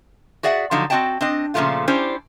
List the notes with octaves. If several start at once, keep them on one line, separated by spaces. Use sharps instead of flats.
F#4 G#4 D5 E5 F#5
D3 F3 F#3 D#4
C4 C#4 F#4 D#5 G5 A5
C4 D4 D#5
A#2 C#3 E3 F3 A3 F4
C#4 D4 E4 G4 C5